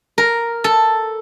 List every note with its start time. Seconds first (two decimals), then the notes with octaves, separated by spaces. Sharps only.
0.18 A#4
0.64 A4